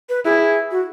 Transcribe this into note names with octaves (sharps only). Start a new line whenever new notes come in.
B4
E4 G#4
F#4